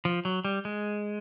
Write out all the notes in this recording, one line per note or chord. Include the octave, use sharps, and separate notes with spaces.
F3
F#3
G3
G#3